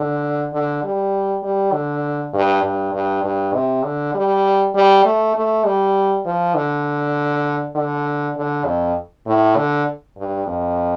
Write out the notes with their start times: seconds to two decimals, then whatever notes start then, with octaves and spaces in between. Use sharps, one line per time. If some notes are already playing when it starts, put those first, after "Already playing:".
Already playing: D3
0.53 D3
0.83 G3
1.43 G3
1.73 D3
2.33 G2
2.63 G2
2.94 G2
3.24 G2
3.54 C3
3.85 D3
4.14 G3
4.74 G3
5.05 A3
5.35 A3
5.65 G3
6.25 F3
6.55 D3
7.75 D3
8.36 D3
8.66 F2
9.27 A2
9.56 D3
10.17 G2
10.46 F2